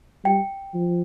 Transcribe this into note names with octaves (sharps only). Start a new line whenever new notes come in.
G3 G5
F3